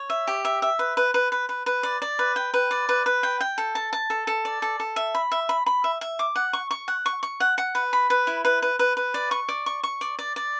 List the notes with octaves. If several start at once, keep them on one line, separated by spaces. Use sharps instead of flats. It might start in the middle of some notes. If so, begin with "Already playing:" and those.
Already playing: C#5
E5
G4
E5
E5
B4
B4
B4
B4
B4
B4
D5
D5
B4
G5
B4
D5
B4
B4
G5
G5
A4
A5
A5
A4
A4
D5
A4
A4
E5
B5
E5
B5
B5
E5
E5
D6
F#5
C#6
C#6
F#5
C#6
C#6
F#5
F#5
B4
B5
B4
E4
B4
B4
B4
B4
D5
C#6
D5
C#6
C#6
D5
D5
D5